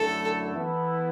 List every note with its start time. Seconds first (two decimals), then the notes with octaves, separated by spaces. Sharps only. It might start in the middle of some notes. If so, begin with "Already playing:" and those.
Already playing: F#2 D3 A3 E4 A4
0.54 E3 B3 E4 A4